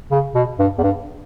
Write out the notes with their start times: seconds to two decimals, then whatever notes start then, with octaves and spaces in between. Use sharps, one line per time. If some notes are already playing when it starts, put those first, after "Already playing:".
0.11 C#3
0.35 B2
0.59 G2
0.78 E2
0.83 G2